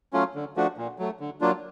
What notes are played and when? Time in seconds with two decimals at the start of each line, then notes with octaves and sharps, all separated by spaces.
0.13 F#3 A3 C#4 F4
0.35 D3
0.56 F3 A3 D4 F#4
0.77 A#2
0.99 F#3 A3
1.20 D3
1.41 F#3 A#3 D4 F4